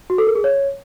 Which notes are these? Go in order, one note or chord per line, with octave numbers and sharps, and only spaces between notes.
F#4
A4
A#4
G#4
C#5